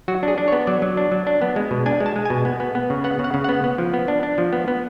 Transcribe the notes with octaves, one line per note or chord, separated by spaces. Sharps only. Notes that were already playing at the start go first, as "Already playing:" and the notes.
F#3 F#4
D4 G#4
D4
C#5
B3
F#3 D5
F#3
D4
F#3
D4
B3
G#3
B2
D4 G#5
G#3
A5
G#3
B2 G#5
B3
B3
B3
C#3
B3 F#5
C#3
F#5
C#3
B3 F#5
B3
F3
B3
D4
D4
F3
B3
B3